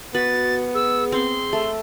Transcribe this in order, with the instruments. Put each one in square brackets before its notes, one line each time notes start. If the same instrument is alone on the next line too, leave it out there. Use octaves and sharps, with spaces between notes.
[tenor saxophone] B3 [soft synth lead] F#4 [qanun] B4 [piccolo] A6
[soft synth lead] G#4 [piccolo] E6
[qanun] C4 [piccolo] C6
[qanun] A3